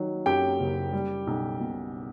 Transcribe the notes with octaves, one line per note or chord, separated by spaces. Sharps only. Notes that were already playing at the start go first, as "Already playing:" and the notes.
Already playing: D#3 F#3
F#2 G4 G5
F#1
G3
B1
B2